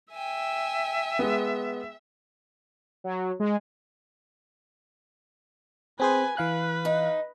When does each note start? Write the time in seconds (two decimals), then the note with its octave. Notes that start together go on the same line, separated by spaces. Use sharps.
0.13 E5 G5 G#5
1.19 G#3 B3
3.04 F#3
3.40 G#3
6.00 C4 G#4 B4 C5 G#5
6.37 E3 B4 F5 F#6
6.85 D#4